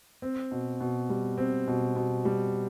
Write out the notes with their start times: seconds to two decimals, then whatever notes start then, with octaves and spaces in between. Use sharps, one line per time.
0.22 C4
0.51 B2
0.80 B2
1.10 G3
1.38 C4
1.68 B2
1.96 B2
2.25 G3